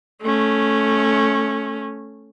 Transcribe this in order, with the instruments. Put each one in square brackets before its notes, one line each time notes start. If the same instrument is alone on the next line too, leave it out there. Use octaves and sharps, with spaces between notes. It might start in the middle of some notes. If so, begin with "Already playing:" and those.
[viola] A3 C#4